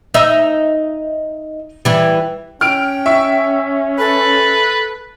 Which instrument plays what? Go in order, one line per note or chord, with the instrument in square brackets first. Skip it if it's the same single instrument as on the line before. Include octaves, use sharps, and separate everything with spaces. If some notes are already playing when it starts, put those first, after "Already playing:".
[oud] D#4 E5
E3 G3
[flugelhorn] C#4 [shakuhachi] G5 [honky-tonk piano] F6 D7
[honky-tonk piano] E5 C#6
[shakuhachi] A4 [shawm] B4